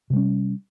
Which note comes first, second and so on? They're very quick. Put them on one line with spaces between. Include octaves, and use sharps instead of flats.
C3 G3 C#4